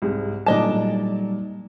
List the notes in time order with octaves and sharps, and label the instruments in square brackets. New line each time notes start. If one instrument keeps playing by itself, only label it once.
[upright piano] C2 G#2
[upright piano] A#2 A3 [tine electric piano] F#3 G3 D#4 [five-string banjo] D4 D#5 A5